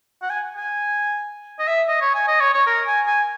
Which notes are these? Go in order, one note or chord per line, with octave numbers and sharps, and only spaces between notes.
F#5
G#5
G#5
D#5
E5
D#5
C#5
G#5
D#5
C#5
C#5
A#4
G#5
G#5